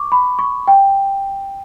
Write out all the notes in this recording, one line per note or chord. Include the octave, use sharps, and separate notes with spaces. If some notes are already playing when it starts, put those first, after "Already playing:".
Already playing: C#6 D6
B5
C#6
G5